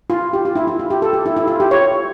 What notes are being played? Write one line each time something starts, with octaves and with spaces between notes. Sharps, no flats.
F4
G4
F4
E4
E4
F4
G4
A4
G4
E4
E4
F4
G4
C#5